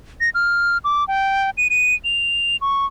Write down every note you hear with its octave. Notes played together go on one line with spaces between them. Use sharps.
A#6
F6
D6
G5
D#7
D#7
F7
C#6